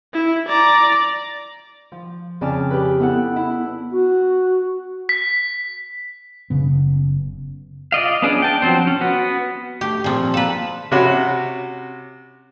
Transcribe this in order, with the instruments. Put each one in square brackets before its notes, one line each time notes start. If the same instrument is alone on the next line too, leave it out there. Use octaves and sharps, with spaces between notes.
[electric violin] E4
D5 A#5
[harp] F3
F2 C#3 D5 G#5 A5 F6
G4 B4
B3 E4 A4 F#5
E4
[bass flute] F#4
[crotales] B6
[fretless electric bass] F#1 C#3 B3
[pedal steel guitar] F4 D5 D#5 F5
B3 C#4 D4 G#4 D5
G5 A5
F3 F#3 C4 C5
C#4
B3 F#4
[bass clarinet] A3 [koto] G4
[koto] A#2 F3 [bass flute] C4
[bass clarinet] A#3 [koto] A4 B4
[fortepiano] C3 C#4 F#4 B5